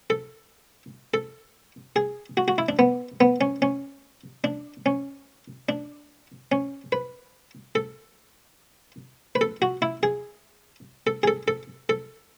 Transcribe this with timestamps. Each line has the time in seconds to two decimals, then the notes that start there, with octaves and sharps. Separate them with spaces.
0.10 A4
1.14 A4
1.96 G#4
2.37 F#4
2.48 F#4
2.58 E4
2.69 D4
2.79 B3
3.21 B3
3.41 C#4
3.62 C#4
4.44 D4
4.86 C#4
5.69 D4
6.52 C#4
6.92 B4
7.75 A4
9.35 B4
9.41 A4
9.62 F#4
9.82 E4
10.03 G#4
11.07 A4
11.23 G#4
11.28 A4
11.48 A4
11.89 A4